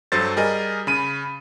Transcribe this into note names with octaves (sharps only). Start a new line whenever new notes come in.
G2 F#3 A4 C5 A6
G3 G#4 A#4 D#5
C#3 B5 D#7